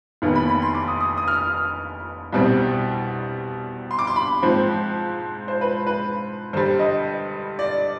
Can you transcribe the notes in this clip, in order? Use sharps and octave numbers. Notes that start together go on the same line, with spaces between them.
F1 D#2 D#3 B3
B5
B5
C6
D6
D#6
D#6
D#6
F6
C2 B2 G3 C4
C6
D6
C6
B5
G#2 F3 C4 C5
C5
B4
B4
G2 D3 G3 C5
D#5
D5